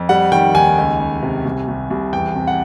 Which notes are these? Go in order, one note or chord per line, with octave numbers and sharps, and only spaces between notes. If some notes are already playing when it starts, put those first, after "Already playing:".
Already playing: F2
G3 F#5
D#3 G5
D#2 G#5
C#2
C#2
C3
C2
C2
C2
E2 G5
C3
F#5